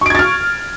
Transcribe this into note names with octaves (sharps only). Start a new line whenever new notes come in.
C#6 F6 G#6 A6 D7